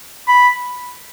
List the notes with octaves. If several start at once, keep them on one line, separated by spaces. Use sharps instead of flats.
B5